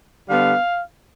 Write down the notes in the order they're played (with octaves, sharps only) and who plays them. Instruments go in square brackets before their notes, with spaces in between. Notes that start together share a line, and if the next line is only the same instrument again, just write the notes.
[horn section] D3 G3 B3 F5